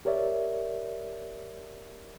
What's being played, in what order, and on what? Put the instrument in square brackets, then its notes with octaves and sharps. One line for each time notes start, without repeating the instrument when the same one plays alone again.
[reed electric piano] G4 A#4 C#5 D5 E5